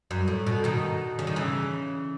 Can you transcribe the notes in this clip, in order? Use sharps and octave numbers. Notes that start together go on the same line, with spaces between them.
F#2
A2
B2
B2 D#3
C#3
D#3
C#3 E3